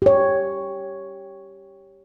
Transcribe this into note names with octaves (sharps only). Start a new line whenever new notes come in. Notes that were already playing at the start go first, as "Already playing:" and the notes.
G4 C#5